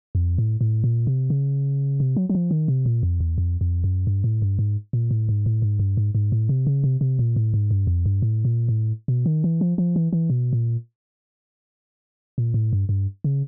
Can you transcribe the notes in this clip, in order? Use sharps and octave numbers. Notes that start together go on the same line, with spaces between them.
F2
A2
A2
A#2
C3
C#3
C3
F#3
F#3
F3
D#3
C3
A#2
F2
E2
F2
F2
F#2
G2
A2
G2
G#2
A#2
A2
G#2
A2
G#2
G2
G#2
G#2
A2
C3
C#3
C3
C3
A#2
A2
G#2
G2
F2
G2
A2
A#2
A2
B2
D#3
E3
F3
F3
E3
E3
B2
A#2
A#2
A2
G2
G2
C#3